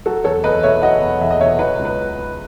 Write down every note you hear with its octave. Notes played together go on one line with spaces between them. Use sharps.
F#3 F#4 A4
E2 A4 C#5
E2 B4 D#5
B2 C#5 E5
F#3 D#5 F#5
E2
E2 E5
D#5
B2 C#5 E5
F#3 B4 D#5
C#2
B4